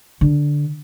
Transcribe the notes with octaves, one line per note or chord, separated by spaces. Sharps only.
D3